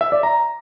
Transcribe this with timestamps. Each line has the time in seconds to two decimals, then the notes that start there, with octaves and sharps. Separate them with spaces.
0.01 E5
0.12 D5
0.23 A#5